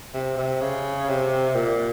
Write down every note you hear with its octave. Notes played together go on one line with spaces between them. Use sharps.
C3
C3
C#3
C3
A#2